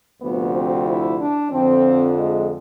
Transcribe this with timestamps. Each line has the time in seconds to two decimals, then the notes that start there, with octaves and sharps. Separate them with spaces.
0.20 D2 C3 F3 B3
0.53 C4
0.86 E4
1.19 D4
1.51 F2 D3 F3 C4
2.16 G#3